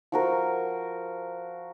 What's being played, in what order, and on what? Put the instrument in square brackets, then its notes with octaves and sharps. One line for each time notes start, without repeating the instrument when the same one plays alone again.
[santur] F3 F#4 A#4